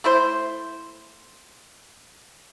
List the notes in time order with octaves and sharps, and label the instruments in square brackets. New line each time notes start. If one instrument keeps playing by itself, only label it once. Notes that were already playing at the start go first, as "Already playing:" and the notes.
[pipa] A3 E4 C5